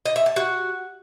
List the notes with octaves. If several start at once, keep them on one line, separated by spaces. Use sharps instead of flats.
D#5
E5
A5
F#4